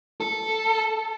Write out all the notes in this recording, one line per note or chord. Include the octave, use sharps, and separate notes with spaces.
A4